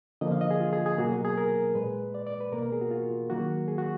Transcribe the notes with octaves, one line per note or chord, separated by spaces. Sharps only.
D3 F3 A#3 D#5
F5
D#5
G#4
F4
G#4
G#4
B2 F#3 A#3 F#4
G#4
G#4
A#4
A#2 G#3 B4
D5
D5
B4
B2 A#3 A#4
A#4
G#4
F#4
F4
D#3 F#3 A#3 F#4
G#4
F#4